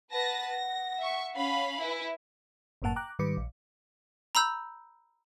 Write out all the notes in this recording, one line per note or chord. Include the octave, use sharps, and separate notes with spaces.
B4 F#5 A5 A#6
A#6
E5 C#6
C#4 F5 B5
E4 B4 G#5
G1 F#2 A2 A#3 F#5 A5
G5 A#5 D6 F#6
G#2 D#3 G3 B4 D6 C#7
A#1
A#5 B5 E6 G6